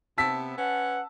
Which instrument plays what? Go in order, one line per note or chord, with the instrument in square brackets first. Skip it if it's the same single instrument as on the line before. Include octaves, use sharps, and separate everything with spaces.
[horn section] C3 B3 [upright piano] A5 E6 B6
[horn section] C#4 B4 F#5